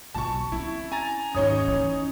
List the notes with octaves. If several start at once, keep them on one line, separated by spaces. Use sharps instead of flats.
B1 F4 A5 C#6
C4 C#4 E4
G#5 A#5 A6
G#1 D#2 C#4 D#4 C#5 D#6
E3